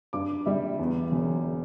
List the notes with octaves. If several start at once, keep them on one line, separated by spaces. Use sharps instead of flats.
G2 D6
G3 E5
E2
E1